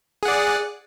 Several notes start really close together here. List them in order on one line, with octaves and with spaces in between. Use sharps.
G#4 F#5 D5